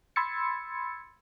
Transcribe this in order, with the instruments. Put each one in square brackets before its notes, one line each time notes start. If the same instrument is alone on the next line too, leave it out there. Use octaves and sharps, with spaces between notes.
[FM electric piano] B5 C6 E6 G#6 A6 C#7